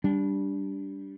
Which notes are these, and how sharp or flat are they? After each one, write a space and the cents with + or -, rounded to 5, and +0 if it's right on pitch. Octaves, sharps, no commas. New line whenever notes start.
G3 +0 D4 -15